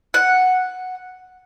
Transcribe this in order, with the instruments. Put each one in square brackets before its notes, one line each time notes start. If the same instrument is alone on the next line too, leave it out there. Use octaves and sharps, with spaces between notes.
[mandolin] F#5